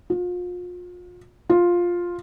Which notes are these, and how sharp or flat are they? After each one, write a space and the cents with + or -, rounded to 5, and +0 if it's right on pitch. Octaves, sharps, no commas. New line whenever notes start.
F4 +35
F4 +5